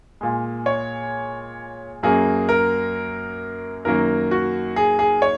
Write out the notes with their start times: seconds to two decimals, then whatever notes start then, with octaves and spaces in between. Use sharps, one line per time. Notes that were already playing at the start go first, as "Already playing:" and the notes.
0.21 A#2 G#3
0.66 C#5
2.03 F#2 F#3 A#3 G#4
2.49 A#4
3.85 F#2 D#3 F#3 A#3 A#4
4.31 F#4
4.76 G#4
4.99 G#4
5.22 C#5